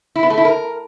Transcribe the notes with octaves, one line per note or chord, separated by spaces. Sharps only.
E4
B3
A3
E4
A#4